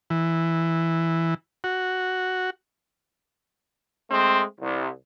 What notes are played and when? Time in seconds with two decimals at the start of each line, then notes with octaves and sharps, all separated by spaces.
0.10 E3
1.64 F#4
4.10 G#3 A3 C4
4.61 C2